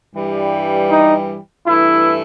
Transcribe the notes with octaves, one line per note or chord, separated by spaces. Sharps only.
G2 E3 G3
D#4
G2 E3 A3 E4